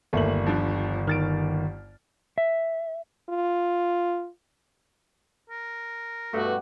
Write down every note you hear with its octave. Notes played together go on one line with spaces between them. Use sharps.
G1 D#2 A3 A#3 F#7
D3 F3
D#3 F6 A6 D7
E5
F4
A#4
G2 B2 A3 F#4